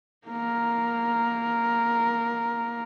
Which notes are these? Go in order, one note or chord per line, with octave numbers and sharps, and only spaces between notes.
A#3 A#4